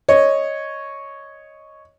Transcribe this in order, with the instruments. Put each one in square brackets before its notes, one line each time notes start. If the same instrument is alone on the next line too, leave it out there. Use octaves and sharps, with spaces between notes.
[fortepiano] C#5 D#5